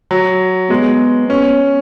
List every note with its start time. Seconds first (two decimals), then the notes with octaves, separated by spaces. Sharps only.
0.11 F#3
0.70 G#3 B3
1.29 B3 C#4